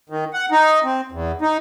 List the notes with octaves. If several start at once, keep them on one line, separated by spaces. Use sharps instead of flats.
D#3
F#5
D#4
C4
E2
D#4